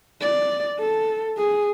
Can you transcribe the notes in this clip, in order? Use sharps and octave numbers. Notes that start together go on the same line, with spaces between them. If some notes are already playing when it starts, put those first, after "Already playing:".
D5
A4
G#4